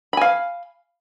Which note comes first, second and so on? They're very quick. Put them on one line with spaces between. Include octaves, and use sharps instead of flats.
B5 G#5 F5